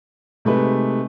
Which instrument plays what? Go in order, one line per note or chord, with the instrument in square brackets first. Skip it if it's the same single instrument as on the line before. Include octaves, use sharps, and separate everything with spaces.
[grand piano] C3 G#3 A3 D#4 B4